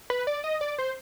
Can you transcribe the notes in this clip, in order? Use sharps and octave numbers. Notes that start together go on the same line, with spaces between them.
B4
D5
D#5
D5
C5